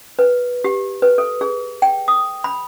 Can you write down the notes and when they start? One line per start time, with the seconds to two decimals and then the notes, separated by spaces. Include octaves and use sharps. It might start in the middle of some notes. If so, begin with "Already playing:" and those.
0.19 B4
0.64 G4
1.02 B4
1.18 A4
1.41 G#4
1.82 G5
2.08 D#6
2.44 B5